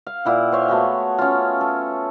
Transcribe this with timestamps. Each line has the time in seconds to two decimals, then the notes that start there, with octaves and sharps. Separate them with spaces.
0.07 F5
0.25 A#2 E4 F#5
0.52 C5 C#5 F5
0.68 A3 B3 F#4 G#4
1.18 C#4 F4
1.61 A4